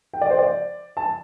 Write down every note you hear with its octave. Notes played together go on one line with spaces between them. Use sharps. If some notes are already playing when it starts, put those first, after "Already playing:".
G5
D5
C5
D5
A5